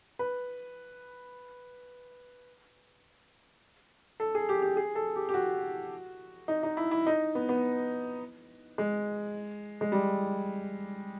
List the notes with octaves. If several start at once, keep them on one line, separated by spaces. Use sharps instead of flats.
B4
A4
G#4
G4
G4
G#4
A4
G4
G4
F#4
D#4
D#4
E4
E4
D#4
B3
B3
G#3
G#3
G3